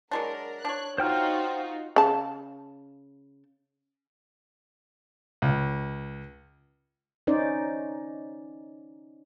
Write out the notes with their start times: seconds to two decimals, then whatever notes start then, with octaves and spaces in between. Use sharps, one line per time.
0.11 F#3 G#3 D4 A#4
0.65 D4 C#5 F#6
0.98 D#4 F4 F#4 C5 G5 F6
1.96 C#3 A5
5.42 C#2
7.27 C#4 D#4 C5 D5